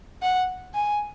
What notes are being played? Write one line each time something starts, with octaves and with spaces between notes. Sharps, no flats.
F#5
G#5